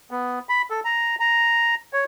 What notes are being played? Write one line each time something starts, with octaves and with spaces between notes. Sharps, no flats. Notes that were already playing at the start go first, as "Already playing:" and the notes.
B3
B5
A4
A#5
A#5
C#5